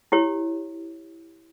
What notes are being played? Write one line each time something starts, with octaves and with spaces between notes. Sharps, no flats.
E4 G4 C#5